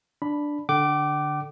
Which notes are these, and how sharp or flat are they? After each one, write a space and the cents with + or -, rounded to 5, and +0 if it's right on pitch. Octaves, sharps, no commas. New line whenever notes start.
D4 +0 B5 +0
D3 +0 G5 -45 D6 +0